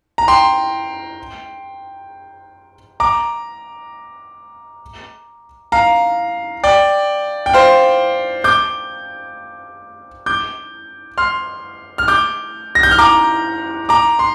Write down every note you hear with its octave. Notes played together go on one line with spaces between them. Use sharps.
A#5
G5 C6
A#5 D6
F5 A#5
D5 G5
G5
C5 F5
D6 G6
D6 G6
C6 F6
F6
D6 G6
A#6
G6
F6
A#5 D6
A#5 D6
C6